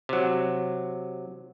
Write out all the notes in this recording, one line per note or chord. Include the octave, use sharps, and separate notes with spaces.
C3 F#3